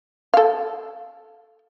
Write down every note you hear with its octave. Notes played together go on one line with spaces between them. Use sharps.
A4 F5